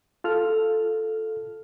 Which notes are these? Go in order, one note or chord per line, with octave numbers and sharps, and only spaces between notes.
F4 A4 F6